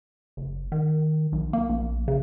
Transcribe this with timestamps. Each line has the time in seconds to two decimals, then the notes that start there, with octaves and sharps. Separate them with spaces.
0.37 F#1
0.72 D#3
1.32 B1
1.53 A#3
1.69 A#1
2.08 C#3